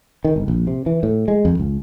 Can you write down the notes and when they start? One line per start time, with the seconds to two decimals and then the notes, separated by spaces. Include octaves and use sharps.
0.25 D#3
0.36 G1
0.48 A#1
0.67 C3
0.86 E3
1.03 A2
1.28 G#3
1.45 F2
1.60 C#2